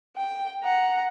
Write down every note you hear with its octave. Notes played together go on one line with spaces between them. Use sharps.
G5
F#5 A#5